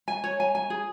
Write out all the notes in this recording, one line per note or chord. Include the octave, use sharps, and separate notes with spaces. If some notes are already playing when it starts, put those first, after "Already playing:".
G#5
C#5
G#5
G#5
G#4